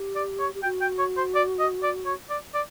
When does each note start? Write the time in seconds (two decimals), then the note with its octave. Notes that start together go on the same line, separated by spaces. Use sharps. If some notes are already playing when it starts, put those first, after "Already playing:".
Already playing: G4
0.16 D5
0.39 C#5
0.54 G4
0.63 F#4 G5
0.81 G5
0.99 C#5
1.17 C5
1.35 D5
1.59 D#5
1.83 D5
2.06 C#5
2.30 D5
2.54 D5